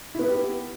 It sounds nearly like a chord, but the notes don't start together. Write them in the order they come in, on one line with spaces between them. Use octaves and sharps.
E4 B3 B4 G4